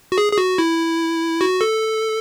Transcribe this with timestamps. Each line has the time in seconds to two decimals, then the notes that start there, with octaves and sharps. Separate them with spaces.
0.12 F#4
0.18 G#4
0.33 G#4
0.38 F#4
0.58 E4
1.41 F#4
1.61 A4